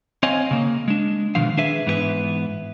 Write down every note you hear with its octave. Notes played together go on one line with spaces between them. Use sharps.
C4 C#5 D#5 F5 G#5
C#3 A#3
G#3 D4
B2 D3 D#3 F3 F5
D4 G#4 B4 E5
G#2 E3 B3 E4 B4 E5